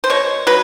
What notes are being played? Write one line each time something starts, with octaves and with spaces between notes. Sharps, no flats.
C5
B2 C#5
F#3 B4